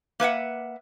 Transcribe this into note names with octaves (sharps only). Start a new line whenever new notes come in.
A#3 B4 E5 F#5